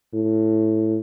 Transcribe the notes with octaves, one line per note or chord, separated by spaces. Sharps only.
A2